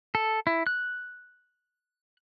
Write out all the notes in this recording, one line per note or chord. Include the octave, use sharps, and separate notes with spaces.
A4
E4
F#6